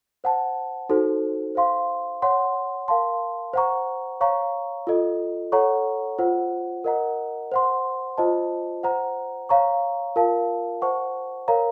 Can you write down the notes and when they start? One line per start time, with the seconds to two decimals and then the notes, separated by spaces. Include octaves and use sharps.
0.24 C5 F#5 A5
0.89 D#4 F#4 A4 C5
1.55 C5 F5 C6
2.22 C#5 F#5 C6
2.88 A#4 F5 A5 C6
3.53 C5 F#5 A#5 C#6
4.21 C#5 F5 A#5 C#6
4.87 F4 A4 D#5
5.52 A4 C#5 F#5 A#5 C#6
6.19 F4 C5 F#5
6.84 A#4 D#5 F#5 A#5
7.52 C5 F#5 C6
8.18 F4 C5 D#5 A5
8.83 C5 F#5 A#5
9.49 C#5 F5 A#5 C#6
10.16 F4 A#4 F5 A5
10.82 C5 F#5 A5 C#6
11.48 A#4 C#5 F5 A#5